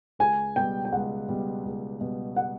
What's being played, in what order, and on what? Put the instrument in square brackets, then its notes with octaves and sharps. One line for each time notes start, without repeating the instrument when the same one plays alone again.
[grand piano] C#2 [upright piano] G#5
[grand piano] B2 G3 [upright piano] G5
[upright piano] G5
[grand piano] C#2 [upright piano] F#5
[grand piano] B2 G3
C#2
B2 G3
[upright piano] F#5